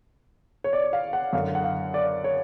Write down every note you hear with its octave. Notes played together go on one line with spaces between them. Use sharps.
C#5
D5
F5
F#5
F#2 D3 F5
F#5
F5
D5
C#5